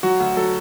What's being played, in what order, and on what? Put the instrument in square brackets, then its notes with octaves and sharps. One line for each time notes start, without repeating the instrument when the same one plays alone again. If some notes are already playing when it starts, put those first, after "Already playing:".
[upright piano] F#3 [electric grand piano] F#4
[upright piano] D2
[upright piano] F#3 [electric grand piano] A4